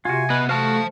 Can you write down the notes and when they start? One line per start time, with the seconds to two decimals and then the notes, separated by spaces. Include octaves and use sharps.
0.05 C3 F4 F#4 G#5
0.30 B3 B4 D#5
0.49 A3 F#4 C5 F5 A5